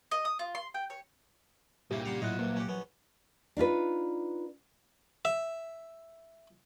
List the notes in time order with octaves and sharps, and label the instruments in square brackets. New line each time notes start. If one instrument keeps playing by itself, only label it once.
[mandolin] D#5
D#6
F4
C6
G5
C#5
[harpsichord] C2 C#3 E4 [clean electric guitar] G2 [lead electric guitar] A#2 [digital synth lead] G4
[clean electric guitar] G2 C#3 G3 [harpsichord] F5 F#5 C6
[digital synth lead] A2 [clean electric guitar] F#3 F#5 [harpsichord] E4 F4 D#5
[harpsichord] C2 G2 C3 [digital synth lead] A#3
[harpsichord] C#4 F#4 G4
A#1 B3 C#4
[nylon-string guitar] D4 D#4 F4 B4
[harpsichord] E5